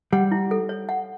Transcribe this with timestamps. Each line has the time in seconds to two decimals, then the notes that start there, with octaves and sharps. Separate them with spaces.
0.12 G3 F#5
0.31 E4
0.51 A4
0.69 C#5
0.89 F#5